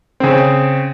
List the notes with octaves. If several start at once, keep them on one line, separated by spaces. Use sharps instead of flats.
C#3 C4